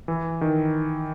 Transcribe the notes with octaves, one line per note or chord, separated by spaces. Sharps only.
E3
D#3